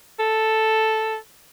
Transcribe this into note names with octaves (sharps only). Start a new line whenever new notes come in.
A4